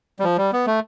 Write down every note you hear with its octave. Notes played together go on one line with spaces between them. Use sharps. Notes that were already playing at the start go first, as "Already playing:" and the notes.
G3
F3
G3
B3
A3